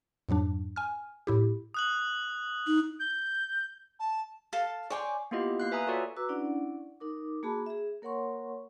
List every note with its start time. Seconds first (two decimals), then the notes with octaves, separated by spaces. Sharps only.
0.29 F2 G#2 F#3 D4
0.76 G#5 F6
1.27 A2 E4 G4
1.74 D#6 F#6 F#7
2.67 D#4 F#7
2.99 G6
3.99 A5
4.53 A4 F5 A5
4.90 C#5 D5 G5 G#5 C6 D6
5.31 A#3 B3 E4 F4 G4 D#5
5.60 A#3 F5 F#6
5.72 B4 E5 G#5 A#5 D#6
5.87 F4 F#4 A4 C#5 D5 F#5
6.17 F#4 B4 A#5 D6 E6
6.29 C#4 D4 E4 D5 F#5
7.00 D#4 A#4 D6
7.43 A#3 F#4 G#4 A5 B5 D6
7.66 G#4 E5
8.02 A#3 A#4 C#5 F#5 C6 C#6